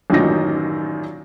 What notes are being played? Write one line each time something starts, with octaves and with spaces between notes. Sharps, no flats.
A1 F#2 A#2 D#3 D#4 A#6